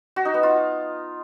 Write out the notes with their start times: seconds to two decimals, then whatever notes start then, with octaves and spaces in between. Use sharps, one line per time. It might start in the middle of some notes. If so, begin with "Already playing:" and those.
0.16 F#4
0.25 D#4
0.34 B3
0.43 F4